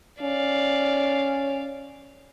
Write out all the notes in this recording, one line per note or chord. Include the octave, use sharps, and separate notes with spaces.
C#4 D5 F5